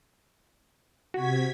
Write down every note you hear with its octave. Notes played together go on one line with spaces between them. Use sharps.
C3 F#4 G#6 B6